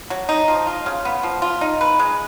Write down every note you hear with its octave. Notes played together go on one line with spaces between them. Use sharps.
F#3
D#4
F3
F4
C#3
B3
F3
F4
D#4
B4
G#3